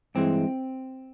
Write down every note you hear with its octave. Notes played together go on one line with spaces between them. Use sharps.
G2 E3 G#3 C4